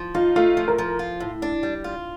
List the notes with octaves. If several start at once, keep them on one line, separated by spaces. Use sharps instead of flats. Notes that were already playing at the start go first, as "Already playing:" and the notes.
Already playing: F3
D#4 F4
A3 F4
F3
A#4
F3
F4
A2
D4
G3
F4